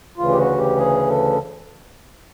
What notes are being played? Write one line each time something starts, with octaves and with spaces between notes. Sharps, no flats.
D2 C#3 E3 F4
G4
F#4
G4
G#4
A4